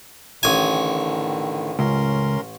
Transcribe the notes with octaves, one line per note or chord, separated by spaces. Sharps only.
A1 A2 D3 D#3 G#5
C#2 C#4 A#4 C6